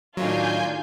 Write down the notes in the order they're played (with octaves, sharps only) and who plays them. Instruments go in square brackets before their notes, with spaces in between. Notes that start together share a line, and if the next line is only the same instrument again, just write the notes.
[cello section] A2 D#3 D4 [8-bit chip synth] F#3 [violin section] F4 [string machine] G#5 G6